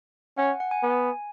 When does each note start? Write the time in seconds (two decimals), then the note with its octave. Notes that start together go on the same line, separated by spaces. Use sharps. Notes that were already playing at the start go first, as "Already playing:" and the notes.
0.38 C#4 F#5
0.48 G#5
0.60 F#5
0.71 G#5
0.83 B3